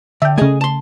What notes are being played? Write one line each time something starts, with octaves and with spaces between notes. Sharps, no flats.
D3 E5 G5
C#3 A3 G#4 D#5 G#5
A5 C6